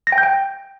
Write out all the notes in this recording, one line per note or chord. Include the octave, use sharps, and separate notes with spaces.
A#6
G5
G6
G5